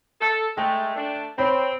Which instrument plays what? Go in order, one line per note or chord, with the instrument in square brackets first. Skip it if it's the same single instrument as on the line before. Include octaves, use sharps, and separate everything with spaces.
[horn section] A4
[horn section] G#3 A3 [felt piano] G5
[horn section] A3 D4
[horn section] C4 [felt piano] C5 C#5 B5